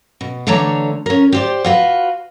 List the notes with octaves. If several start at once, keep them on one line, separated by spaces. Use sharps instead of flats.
B2
D3 E3 A3 D4 C#5 A#5
C#4 A#4
G4 C5 D5
F4 F#4 B4